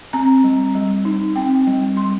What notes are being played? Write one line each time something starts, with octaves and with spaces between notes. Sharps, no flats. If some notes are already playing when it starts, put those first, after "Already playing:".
C4 A#5
G3
G3
D#4
C4 G5
G3
G3 C6